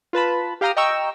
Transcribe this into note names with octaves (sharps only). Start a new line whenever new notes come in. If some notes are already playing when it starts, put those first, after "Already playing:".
F4 B4 A5 B5
G4 F5 G5 A#5 D#6 F6
D#5 G5 A#5 C#6 E6